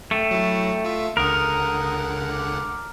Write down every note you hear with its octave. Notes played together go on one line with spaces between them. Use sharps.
A3 G5
F#3 E4
F4 E5
C#2 D3 A#4 F#5 D#6
D6